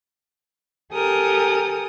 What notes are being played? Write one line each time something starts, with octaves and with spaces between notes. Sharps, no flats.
G4 A4 A#4 G#5 D#6